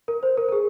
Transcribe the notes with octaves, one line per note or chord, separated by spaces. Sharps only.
A#4
C5
A#4
A#4
G#4